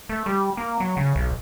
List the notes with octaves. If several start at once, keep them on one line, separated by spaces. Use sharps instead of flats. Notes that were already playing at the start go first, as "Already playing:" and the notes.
A3
G3
A#3
F#3
C#3
B1